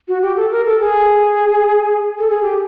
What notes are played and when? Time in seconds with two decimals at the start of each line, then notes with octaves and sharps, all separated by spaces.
0.08 F#4
0.22 G4
0.36 A4
0.52 A#4
0.66 A4
0.81 G#4
2.19 A4
2.30 G#4
2.42 G4